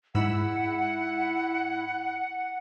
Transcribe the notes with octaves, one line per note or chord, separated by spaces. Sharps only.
G#2 E4 F#5 B5 E6